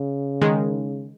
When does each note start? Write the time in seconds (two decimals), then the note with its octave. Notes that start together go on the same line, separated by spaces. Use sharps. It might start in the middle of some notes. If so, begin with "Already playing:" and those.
Already playing: C#3
0.42 D#3 G#3